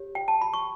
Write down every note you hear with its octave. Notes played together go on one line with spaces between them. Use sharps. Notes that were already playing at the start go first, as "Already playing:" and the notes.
Already playing: G4 C#5
G5
A5
B5
C#6